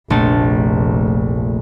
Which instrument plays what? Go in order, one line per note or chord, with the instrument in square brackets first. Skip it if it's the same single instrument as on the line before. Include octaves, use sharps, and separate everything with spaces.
[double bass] F1 [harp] A#1 A3 A6